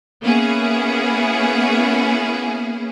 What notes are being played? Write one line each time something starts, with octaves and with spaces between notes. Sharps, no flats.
A#3 B3 C#4 E4 G#4